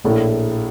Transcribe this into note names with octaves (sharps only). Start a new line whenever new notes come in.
A#1 A2 A3